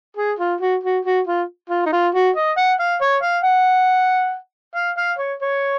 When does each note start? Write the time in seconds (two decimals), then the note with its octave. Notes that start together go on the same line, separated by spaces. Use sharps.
0.17 G#4
0.39 F4
0.60 F#4
0.83 F#4
1.05 F#4
1.27 F4
1.69 F4
1.86 D#4
1.92 F4
2.14 F#4
2.35 D#5
2.57 F#5
2.80 F5
3.01 C#5
3.22 F5
3.44 F#5
4.75 F5
4.97 F5
5.18 C#5
5.41 C#5